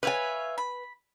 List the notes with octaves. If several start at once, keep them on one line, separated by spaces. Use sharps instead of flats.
B4 C#5 E5 F5 G#5
B5